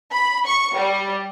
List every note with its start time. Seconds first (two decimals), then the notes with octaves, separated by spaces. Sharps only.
0.12 B5
0.46 C#6
0.75 G3